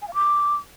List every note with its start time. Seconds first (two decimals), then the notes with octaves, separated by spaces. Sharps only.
0.02 G#5
0.08 F5
0.14 D6